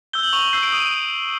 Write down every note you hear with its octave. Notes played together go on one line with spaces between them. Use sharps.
E6 G6 G7
F#7
C#6 F7
E6 G6 C7
D7
D#6 D#7